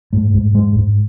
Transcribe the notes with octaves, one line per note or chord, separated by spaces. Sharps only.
G#2 A3
G#2
G#2 G#3
G#2